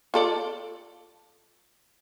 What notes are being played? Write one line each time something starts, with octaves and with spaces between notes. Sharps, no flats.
F4 A4 D5